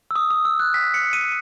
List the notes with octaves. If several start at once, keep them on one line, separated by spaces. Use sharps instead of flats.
E6
D#6
D#6
E6
F#6
B6
C#7
D#7